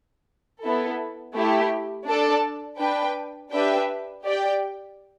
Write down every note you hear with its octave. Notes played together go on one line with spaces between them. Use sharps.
B3 E4 A4
A3 E4 G4
D4 A4 D5 A5
D4 B4 G5
D4 G4 B4 E5 G5
G4 D5 G5